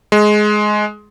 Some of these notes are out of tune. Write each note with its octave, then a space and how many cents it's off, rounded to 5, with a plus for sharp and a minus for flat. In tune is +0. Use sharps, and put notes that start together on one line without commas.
G#3 +15